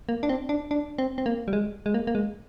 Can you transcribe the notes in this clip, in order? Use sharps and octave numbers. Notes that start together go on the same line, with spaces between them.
A#3
D4
C4
D4
D4
C4
C4
A#3
G3
G#3
G#3
A#3
A#3
G#3